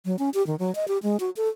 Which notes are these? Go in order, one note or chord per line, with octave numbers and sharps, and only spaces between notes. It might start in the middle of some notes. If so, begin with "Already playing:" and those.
F#3
C#4
G4
D#3
F#3
D#5
G4
G#3
F#4
A4